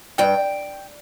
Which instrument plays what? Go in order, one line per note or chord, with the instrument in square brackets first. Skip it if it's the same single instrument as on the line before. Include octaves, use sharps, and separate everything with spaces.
[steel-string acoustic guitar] G2 [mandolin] G5